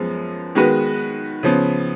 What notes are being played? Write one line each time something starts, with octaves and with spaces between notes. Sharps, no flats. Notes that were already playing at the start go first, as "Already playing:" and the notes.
Already playing: F#2 F3 G#3 B3
D#3 G#3 B3 F#4 B4
C#3 F3 B3